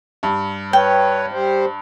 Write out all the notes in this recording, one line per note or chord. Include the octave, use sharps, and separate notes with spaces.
G2
B4 C#5 G5
G3 G4 C5